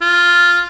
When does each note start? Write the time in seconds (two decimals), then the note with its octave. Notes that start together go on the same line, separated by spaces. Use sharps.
0.02 F4